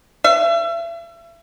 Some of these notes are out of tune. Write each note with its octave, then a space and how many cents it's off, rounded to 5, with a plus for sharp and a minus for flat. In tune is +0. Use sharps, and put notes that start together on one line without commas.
E5 +35